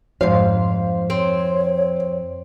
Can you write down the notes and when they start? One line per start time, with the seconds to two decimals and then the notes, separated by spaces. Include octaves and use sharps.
0.21 F2 G#2 C5 F5
1.10 C4 C#5